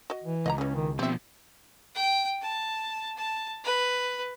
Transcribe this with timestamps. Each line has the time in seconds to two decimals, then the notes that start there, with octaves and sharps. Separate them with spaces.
0.10 F#4 D#5
0.24 E3
0.46 C#2 D#5 F#5 A#5
0.58 E3 C#4 G#4
0.75 D#3
0.99 B2 F3 C4 G4 E5
1.95 G5
2.42 A5
3.17 A5
3.64 B4